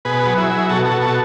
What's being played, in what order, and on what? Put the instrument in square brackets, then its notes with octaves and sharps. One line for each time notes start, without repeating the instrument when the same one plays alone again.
[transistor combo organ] B2 G#4 B4
F#3
E4 G#4
F#3
B2 F#4 A4
F#4 A4
B2
F#4 A4